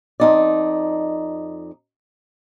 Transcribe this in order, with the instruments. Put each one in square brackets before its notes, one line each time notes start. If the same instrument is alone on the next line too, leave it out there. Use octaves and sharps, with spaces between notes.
[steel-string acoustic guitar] F2 D#4 D5